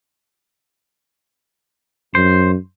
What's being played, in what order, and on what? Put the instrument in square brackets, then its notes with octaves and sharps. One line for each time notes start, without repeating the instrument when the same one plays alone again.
[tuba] F#2 [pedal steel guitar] C5